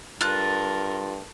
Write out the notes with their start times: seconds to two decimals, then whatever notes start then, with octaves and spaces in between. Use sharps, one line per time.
0.21 G2 F4 A4 A#4 F#6